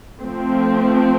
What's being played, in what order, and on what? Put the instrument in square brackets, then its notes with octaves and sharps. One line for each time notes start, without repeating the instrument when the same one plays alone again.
[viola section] F3 A3 C4